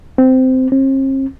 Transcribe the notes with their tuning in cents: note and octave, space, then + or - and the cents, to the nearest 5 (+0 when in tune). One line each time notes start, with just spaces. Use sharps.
C4 -15
C4 +45